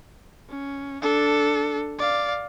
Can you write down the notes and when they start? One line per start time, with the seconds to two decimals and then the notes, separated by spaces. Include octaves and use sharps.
0.49 C#4
1.02 D4 A4
1.99 D5 F5